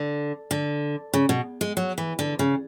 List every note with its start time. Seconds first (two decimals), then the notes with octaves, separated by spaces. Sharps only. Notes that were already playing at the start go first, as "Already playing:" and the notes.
Already playing: D3
0.51 D3
1.14 C#3
1.29 B2
1.61 G#3
1.77 F#3
1.98 E3
2.19 D3
2.39 C#3